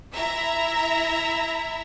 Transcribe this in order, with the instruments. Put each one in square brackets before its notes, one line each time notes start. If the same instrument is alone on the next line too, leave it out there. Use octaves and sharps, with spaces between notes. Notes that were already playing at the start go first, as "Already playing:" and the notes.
[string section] E4 E5 A#5